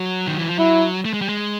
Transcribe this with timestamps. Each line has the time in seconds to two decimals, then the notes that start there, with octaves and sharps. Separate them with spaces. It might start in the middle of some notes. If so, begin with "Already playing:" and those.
Already playing: F#3
0.27 D#3
0.38 E3
0.48 F3
0.58 F#3 E4
1.05 A3
1.13 G#3
1.21 G3
1.29 G#3